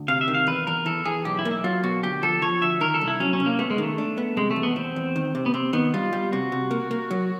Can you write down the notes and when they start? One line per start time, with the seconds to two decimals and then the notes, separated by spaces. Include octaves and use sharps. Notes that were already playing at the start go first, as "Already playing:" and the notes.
Already playing: D2
0.08 C3 F5
0.21 E5
0.28 D#3
0.34 F5
0.47 E2 B4
0.67 E2 A#4
0.86 E3 A4
1.05 E3 G#4
1.25 B1 G4
1.39 E4
1.45 A#3
1.51 E4
1.64 F#3 F4
1.84 B2 F#4
2.03 D2 G4
2.23 F3 A4
2.42 F3 C#5
2.62 D2 E5
2.81 D#3 A#4
2.94 A4
3.01 C2
3.08 E4
3.20 F#3 C#4
3.33 C#4
3.40 C2
3.46 A#3
3.59 A3 B3
3.71 G#3
3.78 D#3 A3
3.98 D4
4.18 B3
4.37 C3 G#3
4.51 A3
4.56 E2
4.63 B3
4.76 E2 C4
4.96 E2
5.16 D#3
5.35 C3
5.46 B3
5.54 C3 C4
5.73 D#3 B3
5.94 G3 F4
6.13 G3
6.32 C3 F#4
6.52 C3
6.71 A#3
6.91 A#3
7.11 F#3